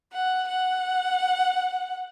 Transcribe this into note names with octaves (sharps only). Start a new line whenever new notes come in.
F#5
F#5